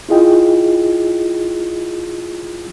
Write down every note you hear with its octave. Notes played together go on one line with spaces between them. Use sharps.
E4 F4 G#4 D#5 G5